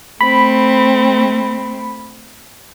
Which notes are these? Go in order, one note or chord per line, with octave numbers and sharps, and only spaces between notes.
A3 C4 B5